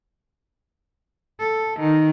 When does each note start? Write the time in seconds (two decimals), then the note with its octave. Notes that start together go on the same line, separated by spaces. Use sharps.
1.40 A4
1.80 D#3